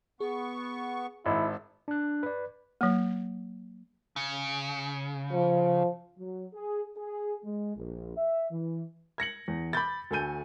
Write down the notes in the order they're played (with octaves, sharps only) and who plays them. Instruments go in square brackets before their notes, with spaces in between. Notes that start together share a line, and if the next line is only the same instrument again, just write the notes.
[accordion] B3 C#6 [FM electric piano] G#4
[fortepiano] G#1 G#2 [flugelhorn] E4
[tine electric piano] D4 F#6
B4 D5
[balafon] F#3 A#3
[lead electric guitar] C#3
[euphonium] F3
[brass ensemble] F#3
G#4
G#4
G#3
A#1
E5
E3
[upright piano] G#6 A#6 C#7 F#7
E2
B5 D6 G6 A6
D2 A3 A4 G#5 G6 D#7